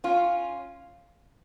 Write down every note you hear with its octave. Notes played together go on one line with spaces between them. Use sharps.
C#4 F4